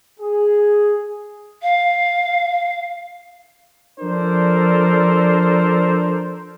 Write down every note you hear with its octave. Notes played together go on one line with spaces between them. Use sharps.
G#4
F5
F3 D4 A4 A#4 C5 D5